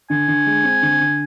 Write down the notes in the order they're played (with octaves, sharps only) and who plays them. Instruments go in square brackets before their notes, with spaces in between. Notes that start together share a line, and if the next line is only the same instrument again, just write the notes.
[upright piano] D3 [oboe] G#5
[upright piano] D3
G#3
C4
D3
D3